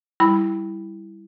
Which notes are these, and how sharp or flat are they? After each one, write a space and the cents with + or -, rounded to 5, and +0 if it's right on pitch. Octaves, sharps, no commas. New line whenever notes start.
G3 +0 E4 -5 B5 +0